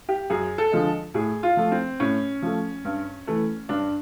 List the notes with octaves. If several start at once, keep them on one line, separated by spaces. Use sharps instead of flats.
G4
F#2 G#4
A4
D3 F3 G#3
A2 G#4
F4
F3 A3
C4
A2 C#4
F3 A3
G2
E3 A3
G2 D4